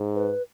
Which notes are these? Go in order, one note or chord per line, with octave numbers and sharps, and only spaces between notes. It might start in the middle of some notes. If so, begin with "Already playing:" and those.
Already playing: G#2
B4